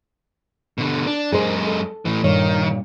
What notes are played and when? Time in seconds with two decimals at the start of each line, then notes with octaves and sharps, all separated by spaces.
0.78 B2 D3
1.07 D4
1.32 F#2 G#3 G#4 A#4 C5
1.67 A4
2.05 A2 E3
2.24 G2 A#2 D#3 C#5